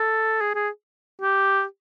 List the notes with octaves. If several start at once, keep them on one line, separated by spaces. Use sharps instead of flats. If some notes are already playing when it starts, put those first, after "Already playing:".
Already playing: A4
G#4
G#4
G4